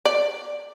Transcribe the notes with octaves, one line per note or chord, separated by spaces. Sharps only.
D5